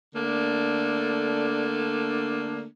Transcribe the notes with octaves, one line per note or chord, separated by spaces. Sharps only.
D3 A3 A#3 D4